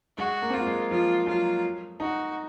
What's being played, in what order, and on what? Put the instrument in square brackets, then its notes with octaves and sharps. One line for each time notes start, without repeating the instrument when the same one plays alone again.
[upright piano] G#3 [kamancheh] F#4
[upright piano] A#3
C4
[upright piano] A#3 [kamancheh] F4
[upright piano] G#3
[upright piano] F3 [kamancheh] F4
[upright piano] F#3 [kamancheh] F4
[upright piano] D#4 [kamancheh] F#4